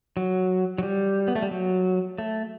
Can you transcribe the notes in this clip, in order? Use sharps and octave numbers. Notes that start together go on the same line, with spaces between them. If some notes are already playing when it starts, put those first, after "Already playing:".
F#3
F#3
G3
B3
A3
G3
F#3
A3